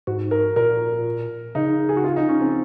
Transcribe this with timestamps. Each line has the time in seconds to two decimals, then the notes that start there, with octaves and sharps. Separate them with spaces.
0.07 G#2 F#4
0.31 A#4
0.56 A#2 A#4
1.55 C#3 D#4
1.89 G#4
1.97 F#4
2.04 F4
2.16 D#4
2.29 C#4
2.41 C4